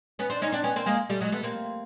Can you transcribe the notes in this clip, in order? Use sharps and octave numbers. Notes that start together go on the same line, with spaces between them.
B3 C#4
C4 D4
C#4 D#4
C4 D4
B3 C#4
A#3 C4
G#3 A#3
G3 A3
F#3 G#3
A3 B3
A#3 C4